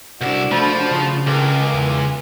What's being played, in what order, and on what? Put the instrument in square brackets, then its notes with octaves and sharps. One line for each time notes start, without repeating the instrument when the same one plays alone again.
[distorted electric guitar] C2 E4 [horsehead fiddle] D4 F#4 [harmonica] D5 F#5
[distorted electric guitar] F3 [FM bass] A3 [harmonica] C5 B5
[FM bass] C#3
[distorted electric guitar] C#2 [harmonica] A4 D6 [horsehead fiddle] A#4 G#5
[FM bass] E2 [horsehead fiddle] G#5